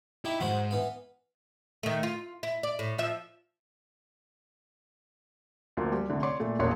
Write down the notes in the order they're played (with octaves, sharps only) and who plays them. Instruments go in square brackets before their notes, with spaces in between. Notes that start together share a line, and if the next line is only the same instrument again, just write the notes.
[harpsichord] D#4 G4 [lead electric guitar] E4
[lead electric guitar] E2 G#2 [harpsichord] F#4 C5 F5
[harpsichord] E3 B3 F5
[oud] D#3 A3
F4
E4
D5
A2
F3 E5
[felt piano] D2 F3 A#3
G3
C2 D3 A3
C#5 D5 C6 D6
A#2 A3
E1 A#1 A#3 C#5 C6 F#6